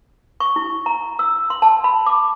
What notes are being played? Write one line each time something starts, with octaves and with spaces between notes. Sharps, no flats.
C#6
E4
A#5
E6
C6
A5
B5
D6